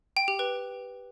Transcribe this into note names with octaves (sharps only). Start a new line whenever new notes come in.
G5
G4
B4